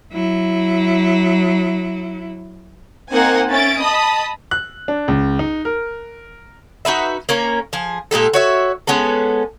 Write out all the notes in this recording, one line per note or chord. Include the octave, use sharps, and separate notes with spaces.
F#3 E4
A#3 C4 D#4 C5 F#5 G#5
C#4 E5 A6 D7
D#5 A5 B5 D#6
F#6
D4
C#2
D#4
A#4
D#4 F#4 B4 E5
A#3 C#4 A#4
F3 G#4
A#2 G#3 G4 A4
F#4 C#5 E5
G#3 B3 C#4 A4